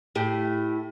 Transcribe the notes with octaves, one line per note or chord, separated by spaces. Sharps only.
A2 G4